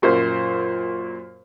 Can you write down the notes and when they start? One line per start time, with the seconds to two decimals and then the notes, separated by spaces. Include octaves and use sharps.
0.02 F#2 A#2 C5